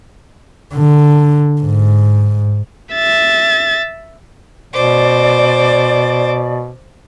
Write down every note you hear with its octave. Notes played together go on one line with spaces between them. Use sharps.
D3
G#2
E5 A6
B2 C5 D5 D6